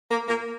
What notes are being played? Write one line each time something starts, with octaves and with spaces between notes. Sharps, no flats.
A#3
A#3